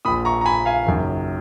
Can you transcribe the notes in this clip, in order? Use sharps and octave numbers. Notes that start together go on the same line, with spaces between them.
A#1 A#2 B5 D#6
A#5 C#6
A#5
G#5 B5
F5 G#5
F#1 F#2 D#3